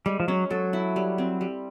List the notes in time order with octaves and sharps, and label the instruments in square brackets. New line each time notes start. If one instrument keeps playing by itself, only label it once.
[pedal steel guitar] G3 [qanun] G#3
[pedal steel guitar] F3
[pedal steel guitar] F#3 [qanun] C#4
[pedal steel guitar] F#3 [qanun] A4
[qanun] E4
G3
C4
G3